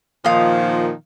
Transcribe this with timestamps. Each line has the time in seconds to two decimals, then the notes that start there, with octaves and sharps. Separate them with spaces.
0.24 A#2 D#3 F3 F5 D#6